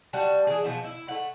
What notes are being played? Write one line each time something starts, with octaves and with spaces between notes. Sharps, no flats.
G3 F#4 A5
E3 G#4
B2 F3
E4
A3 F#5